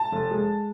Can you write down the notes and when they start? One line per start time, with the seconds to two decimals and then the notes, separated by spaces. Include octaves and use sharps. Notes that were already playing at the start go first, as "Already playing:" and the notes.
Already playing: A5
0.12 F1
0.30 G#3